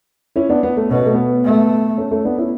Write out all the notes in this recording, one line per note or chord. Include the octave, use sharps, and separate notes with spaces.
C#4 E4
B3 D4
B3
A3
B2 C#4
B3
A3
B3
A3
A3 C#4
A3 C#4
B3 D4
C#4 E4